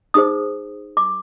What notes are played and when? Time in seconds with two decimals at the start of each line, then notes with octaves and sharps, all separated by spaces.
0.14 D#4 G#4 C5 D#6
0.97 D6